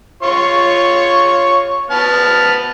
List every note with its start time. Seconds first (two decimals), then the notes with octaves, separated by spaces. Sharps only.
0.23 F4 C#5 C#6
1.90 B3 A5 F6